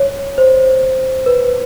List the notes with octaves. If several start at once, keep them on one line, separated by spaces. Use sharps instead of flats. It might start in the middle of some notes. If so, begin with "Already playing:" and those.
Already playing: C#5
C5
B4